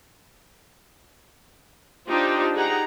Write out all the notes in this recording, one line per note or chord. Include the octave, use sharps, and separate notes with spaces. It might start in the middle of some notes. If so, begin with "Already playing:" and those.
D4 D#4 F4 G4 C5
D#4 G4 G#4 F#5 A#5